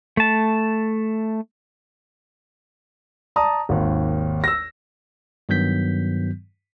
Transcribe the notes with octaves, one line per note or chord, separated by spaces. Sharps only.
A3 A5
D5 A5 A#5 D#6
G#1 D#2
E6 A#6
G2 D#3 F#3 B3 G6 B6